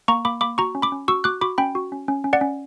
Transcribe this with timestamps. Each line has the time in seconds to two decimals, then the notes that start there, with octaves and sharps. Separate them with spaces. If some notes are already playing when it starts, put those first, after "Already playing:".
0.08 A#3 A#5 C#6
0.25 A#3 B5 D6
0.41 A#3 B5 D6
0.58 F#4 A#5 C#6
0.75 C#4
0.82 B5 D6
0.92 C#4
1.08 F#4 C#6 E6
1.24 F#4 D6 F#6
1.41 F#4 B5 D6
1.58 C#4 G5 B5
1.75 F#4
1.92 C#4
2.08 C#4
2.24 C#4
2.33 D5 F#5
2.41 C#4